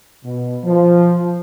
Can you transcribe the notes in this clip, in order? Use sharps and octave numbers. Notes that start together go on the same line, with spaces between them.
B2
F3